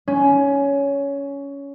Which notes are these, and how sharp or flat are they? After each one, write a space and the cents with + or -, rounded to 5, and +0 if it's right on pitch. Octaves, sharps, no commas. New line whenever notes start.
C#4 +15